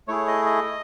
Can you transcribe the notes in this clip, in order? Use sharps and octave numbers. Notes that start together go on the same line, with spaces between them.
A3 E4 G#4 C#5
D#5
D#5